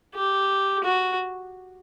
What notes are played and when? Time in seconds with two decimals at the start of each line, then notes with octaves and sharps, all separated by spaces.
0.15 G4
0.84 F#4